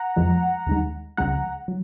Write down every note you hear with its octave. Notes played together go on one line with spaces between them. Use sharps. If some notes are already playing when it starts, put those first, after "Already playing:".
Already playing: F#5 A#5
F2 F3 G#3
D#2 D#3 G#3
C#2 C#3 F3 G#3 F#5 A#5
F#3